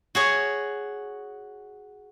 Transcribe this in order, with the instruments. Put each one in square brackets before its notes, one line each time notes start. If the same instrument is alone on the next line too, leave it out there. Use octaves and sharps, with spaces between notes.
[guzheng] F#4 G#4 C#5